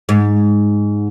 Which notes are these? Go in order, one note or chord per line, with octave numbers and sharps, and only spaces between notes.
G#2